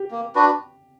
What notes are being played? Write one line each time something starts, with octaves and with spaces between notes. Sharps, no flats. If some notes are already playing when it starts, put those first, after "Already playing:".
Already playing: G4
A#3
D4 F#4 B4